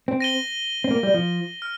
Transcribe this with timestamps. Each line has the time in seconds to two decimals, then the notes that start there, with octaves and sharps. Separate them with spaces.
0.08 C4
0.20 A#6 D#7 G7
0.84 C4
0.91 A#3
1.03 G3
1.14 F3
1.62 F6